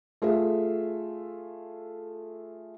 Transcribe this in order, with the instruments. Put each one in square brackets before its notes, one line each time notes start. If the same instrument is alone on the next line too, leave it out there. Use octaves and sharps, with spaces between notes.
[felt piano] A3 F4 G#4 A4 E5